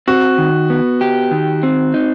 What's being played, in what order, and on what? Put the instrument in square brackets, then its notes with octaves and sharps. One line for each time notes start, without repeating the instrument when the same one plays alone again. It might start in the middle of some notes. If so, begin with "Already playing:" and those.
[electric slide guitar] C4 [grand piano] F#4
[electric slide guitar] D#3
B3
G4
D#3
C4
D#4